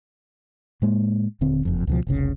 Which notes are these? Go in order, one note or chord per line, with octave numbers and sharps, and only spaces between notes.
A2 G#3 A#3
D#1 D3 C4
F#1 F2
C#2 B2 F3
F1 C2 C#3